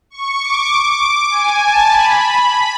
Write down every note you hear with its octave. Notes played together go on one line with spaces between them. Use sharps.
C#6
D6
D6
D6
G#5
A5
B5